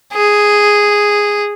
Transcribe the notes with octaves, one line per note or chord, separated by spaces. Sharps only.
G#4